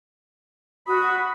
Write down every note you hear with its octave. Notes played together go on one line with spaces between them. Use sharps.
F#4 B5 D#6